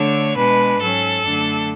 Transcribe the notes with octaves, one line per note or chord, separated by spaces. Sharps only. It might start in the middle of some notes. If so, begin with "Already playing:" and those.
Already playing: D3 A3 D4 C#5
B2 G#3 D4 B4
G#2 F#3 C#4 A4
F#2 D3 A3 D4